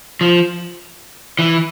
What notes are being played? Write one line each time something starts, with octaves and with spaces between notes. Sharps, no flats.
F3
E3